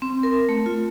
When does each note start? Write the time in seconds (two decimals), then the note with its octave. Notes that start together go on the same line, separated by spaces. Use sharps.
0.02 C4
0.23 A#4
0.49 A3
0.66 F4